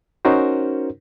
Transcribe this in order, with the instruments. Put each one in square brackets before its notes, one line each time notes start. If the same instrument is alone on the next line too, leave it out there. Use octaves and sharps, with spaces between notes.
[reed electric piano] C#4 D#4 F#4 A#4 C5